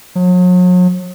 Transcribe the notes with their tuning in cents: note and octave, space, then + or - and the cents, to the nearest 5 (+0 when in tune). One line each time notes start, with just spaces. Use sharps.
F#3 -40